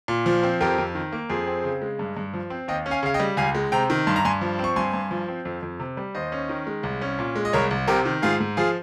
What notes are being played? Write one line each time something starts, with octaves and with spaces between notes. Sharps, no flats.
A#2
F3
C4
F2 G4 A#4
F2
D#3
A#3
F2 G#4 C5
C4
C#3
G#3
G2
G2
F3
C4
D#2 D#5 G5
C#4
F5 G#5
C#3 F5
D#5 G5
G3
C#2 F5 G#5
G#3
C3 G5 A#5
D#3
G2 C6
A#5
G2 G#5 C6
F3
C4 C#6
G2 G#5 C6
G2
F3
C4
F2
F2
C3
G3
D#2 C5 D#5
C#4
D#3
G#3
C2
C#4
A#2
G#3
D#5
C2 A#4 C#5
C2
C3 G4 A#4
D#3
G#2 F4 G#4
G#2
F3 F4 G#4